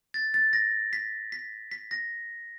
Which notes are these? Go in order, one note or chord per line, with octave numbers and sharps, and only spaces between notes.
A6
A6
A#6
B6
B6
B6
A#6